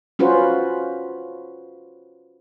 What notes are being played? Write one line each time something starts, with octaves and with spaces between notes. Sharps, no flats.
C#4 F4 F#4 B4 C5